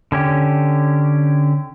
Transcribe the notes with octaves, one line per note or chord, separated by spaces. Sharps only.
D3 C#4 G4